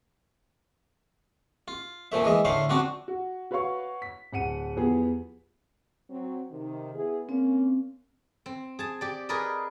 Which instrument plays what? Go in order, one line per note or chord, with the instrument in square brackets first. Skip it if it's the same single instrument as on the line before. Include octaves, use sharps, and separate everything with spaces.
[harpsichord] F4
A#2 F3 A3 E5
E3 G#3 D#5 E5
A2 D3 A3 E5 F5 C6
F3 C4 D4 F#4
[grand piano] F#4
F#4 B4 C#5 F5 C#6
B6
D1 F#5 C#7 D#7
E2 F3 B3 G4 G#4
[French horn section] F#3 C4
C3 D#3
B3 E4 G#4
[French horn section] A#3 C#4 [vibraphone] C4
[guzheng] C4
G#4 A5
G4 D5
G#4 A#4 B4 D5 D#5